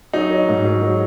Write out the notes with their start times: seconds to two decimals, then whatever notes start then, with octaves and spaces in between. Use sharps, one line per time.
0.13 F#3 D#4
0.31 F#3
0.49 G#2
0.65 F#3
0.83 F#3